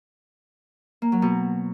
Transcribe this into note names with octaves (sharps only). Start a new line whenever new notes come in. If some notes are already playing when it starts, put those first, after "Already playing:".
A#3
F#3
B2